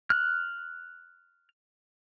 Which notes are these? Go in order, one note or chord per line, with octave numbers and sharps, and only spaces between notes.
F6 F#6